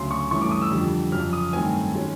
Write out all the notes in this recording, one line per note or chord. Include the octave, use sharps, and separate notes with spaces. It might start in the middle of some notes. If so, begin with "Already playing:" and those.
Already playing: D2 C#3 F#3 C6
C#6
G2 E3 A3 C#4 C#6
D6
D#6
E6
F2 D3 G3
F2 C#3 F#3 F6
D#6
G2 D#3 F#3 A3 C4 G#5
D#3 G#3 C#4